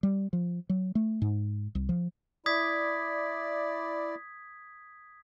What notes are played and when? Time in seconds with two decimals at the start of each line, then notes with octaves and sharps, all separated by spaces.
0.03 G3
0.33 F3
0.69 F#3
0.95 A3
1.22 G#2
1.75 C2
1.89 F3
2.46 E4 D5 D#6 G#6 B6